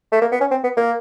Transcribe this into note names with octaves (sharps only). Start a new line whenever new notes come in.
A3
A#3
B3
C#4
C4
B3
A#3